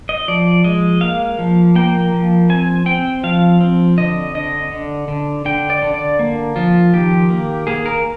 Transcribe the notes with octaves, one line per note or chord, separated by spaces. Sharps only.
D#5
F3 D5
G#3 D#5
A#3 F5
F3
A#3 G5
F3
C4 G#5
C4 G5
F3 F5
C4
D3 D#5
D3 D#5
D3
D3
D3 G5
D5
D3
D5
A#3
F3 F4
D#3 G4
A#3
A#3 G#4
A#4